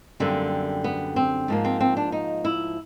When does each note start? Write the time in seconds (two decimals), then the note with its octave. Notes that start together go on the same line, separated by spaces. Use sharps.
0.20 F#2 D3 G3 A#3 C4
0.84 B3
1.16 C4
1.48 G#2 F3 A#3
1.65 C4
1.80 C4
1.97 D4
2.12 D#4
2.45 E4